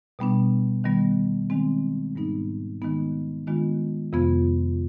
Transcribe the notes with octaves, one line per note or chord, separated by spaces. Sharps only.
B2 G3 B3 D4
D#3 G3 B3
D#3 G#3 C4
G#2 G3 B3 D#4
D#3 G#3 B3 D#4
D#3 G#3 B3 D4 F4
F2 C3 F3 B3 F4